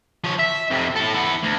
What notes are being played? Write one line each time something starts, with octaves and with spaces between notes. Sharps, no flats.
F3 C#5
E5
F2 C3
E4 A4
E4 F#5
D2